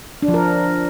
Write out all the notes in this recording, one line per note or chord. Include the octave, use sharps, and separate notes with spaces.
D4
F3
A#4